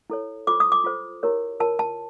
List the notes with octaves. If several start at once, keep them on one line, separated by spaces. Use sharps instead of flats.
E4 A4 C#5
F4 A4 C5 D6
D#6
D6
F4 A4 C5
E4 G4 A#4 C#5
F4 A#4 C#5 A5
A5